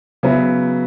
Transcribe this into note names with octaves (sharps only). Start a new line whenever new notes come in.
C#3 F#3 B3 E4